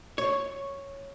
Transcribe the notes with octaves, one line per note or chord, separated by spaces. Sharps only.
C#5